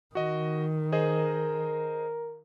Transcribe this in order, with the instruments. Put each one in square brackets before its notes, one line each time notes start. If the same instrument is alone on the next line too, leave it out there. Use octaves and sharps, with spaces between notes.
[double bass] D#3 [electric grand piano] F#4 D#5
[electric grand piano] G#4 C5 D#5 [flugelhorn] A#4